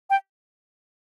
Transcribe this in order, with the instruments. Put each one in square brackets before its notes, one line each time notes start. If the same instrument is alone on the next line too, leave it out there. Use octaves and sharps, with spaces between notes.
[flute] G5